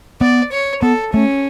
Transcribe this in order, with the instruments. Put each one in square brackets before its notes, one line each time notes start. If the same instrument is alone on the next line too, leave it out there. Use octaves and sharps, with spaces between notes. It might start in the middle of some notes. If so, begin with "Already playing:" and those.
[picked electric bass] B3 [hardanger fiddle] D5
[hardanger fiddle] C#5
[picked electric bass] B3 [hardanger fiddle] A4
[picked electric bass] A3 [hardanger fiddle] C#4